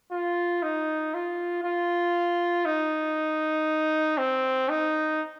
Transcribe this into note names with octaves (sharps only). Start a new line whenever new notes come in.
F4
D#4
F4
F4
D#4
C4
D#4